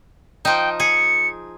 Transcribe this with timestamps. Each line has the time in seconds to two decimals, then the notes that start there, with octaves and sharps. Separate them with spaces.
0.45 F3 D#4 G5
0.80 G#4 C#7